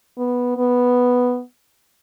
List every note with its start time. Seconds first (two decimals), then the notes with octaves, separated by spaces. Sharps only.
0.18 B3
0.57 B3